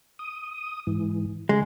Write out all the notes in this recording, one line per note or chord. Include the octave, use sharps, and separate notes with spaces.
D#6
G#2 E3
C#3 G#3